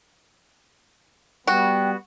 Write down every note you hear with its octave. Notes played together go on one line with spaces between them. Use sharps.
G3 B3 F#4 G5